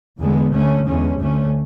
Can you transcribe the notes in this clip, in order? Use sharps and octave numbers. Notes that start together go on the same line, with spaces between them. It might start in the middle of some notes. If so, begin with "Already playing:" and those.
E2 D3 G#3 B3
D2 D3 A3 C#4
E2 D3 G#3 C#4
D2 D3 A3 C#4